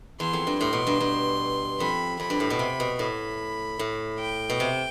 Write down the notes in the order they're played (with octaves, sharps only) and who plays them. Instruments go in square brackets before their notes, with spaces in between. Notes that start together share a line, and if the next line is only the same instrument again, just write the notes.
[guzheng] E2 [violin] C6
[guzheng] F2
G2
[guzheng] A2 [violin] C6
[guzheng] B2
G2
G2
[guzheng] F2 [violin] B5
[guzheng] F2 [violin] B5
[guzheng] G2
A2
B2
C3
B2
[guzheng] A2 [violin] B5
[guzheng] A2
[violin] G5
[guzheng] B2
C3